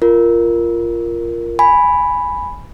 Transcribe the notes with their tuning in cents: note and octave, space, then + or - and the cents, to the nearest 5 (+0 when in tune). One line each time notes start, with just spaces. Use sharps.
F4 -15 A#4 +0
G#5 +0 B5 +0